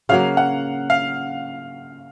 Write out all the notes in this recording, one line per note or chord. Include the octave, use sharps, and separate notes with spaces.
C#3 F#3 A#3 F5
F#5
F5